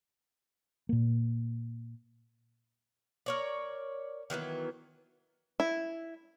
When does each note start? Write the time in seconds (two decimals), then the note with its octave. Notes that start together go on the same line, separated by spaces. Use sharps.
0.89 A#2 A#3
3.26 A#4 C#5 D5
4.30 D#3 E3 F#3 B3
5.60 E4